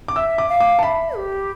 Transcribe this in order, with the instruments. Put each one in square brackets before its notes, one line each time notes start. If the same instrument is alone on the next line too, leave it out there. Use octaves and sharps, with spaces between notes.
[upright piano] D6
[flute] E5 [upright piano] E6
[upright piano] D6
[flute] F5
[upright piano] D6
A5
[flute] E5 [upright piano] B5
[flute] G4